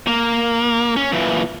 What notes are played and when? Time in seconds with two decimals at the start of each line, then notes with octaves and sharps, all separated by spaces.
0.07 A#3
0.96 C#4
1.13 A#2 E3